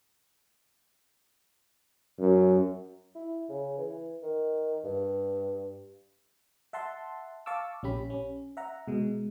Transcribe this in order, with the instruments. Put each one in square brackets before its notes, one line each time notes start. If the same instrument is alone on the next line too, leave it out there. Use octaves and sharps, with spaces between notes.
[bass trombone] F#2
[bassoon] E4
C#3
E3
D#3
G2
[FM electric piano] E5 F#5 A5 C6
F5 A5 C#6 D6 E6
A#1 C#4 G4 B5
C#4
E5 F#5 A#5
B2 G#3